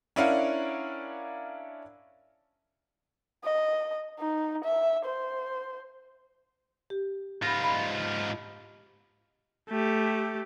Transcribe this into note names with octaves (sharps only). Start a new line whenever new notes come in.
C#4 D4 E4 A#4 F5 F#5
D#5
D#4
E5
C5
G4
G#2 F4 B5 A#6
B5
A3 G4